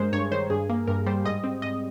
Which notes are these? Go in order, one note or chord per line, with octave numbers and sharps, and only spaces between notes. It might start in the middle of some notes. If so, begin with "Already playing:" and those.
Already playing: G2 G#3 A#4 C5
G2 C#5
D#3 C5
G2 G#4
A#3
G2 A#4
G3 C5
G#2 D#5
C4
G#2 D#5